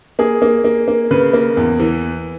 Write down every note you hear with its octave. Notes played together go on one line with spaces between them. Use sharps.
A#3 G#4
A#3
A#3
A#3
C#3 B4
A#3
E2
E3